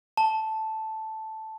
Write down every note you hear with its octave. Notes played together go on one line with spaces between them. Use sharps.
A5